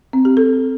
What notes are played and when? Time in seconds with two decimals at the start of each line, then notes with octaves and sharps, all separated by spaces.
0.13 C4
0.25 G4
0.37 A4